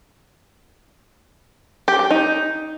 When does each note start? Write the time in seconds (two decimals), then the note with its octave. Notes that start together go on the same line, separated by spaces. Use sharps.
1.88 G4
1.99 G4
2.11 D#4